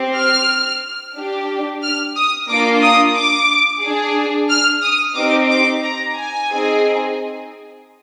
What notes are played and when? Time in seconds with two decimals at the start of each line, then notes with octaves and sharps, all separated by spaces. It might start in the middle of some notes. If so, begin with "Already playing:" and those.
Already playing: C4 G4
0.16 F6
1.15 D4 G4
1.83 F6
2.16 D#6
2.49 A#3 D4 F4 D6
2.82 D#6
3.16 D6
3.82 D4 G#4
4.50 F6
4.83 D#6
5.16 C4 D#4 G4 D6
5.50 D6
5.83 A#5
6.16 G#5
6.50 C4 D#4 G#4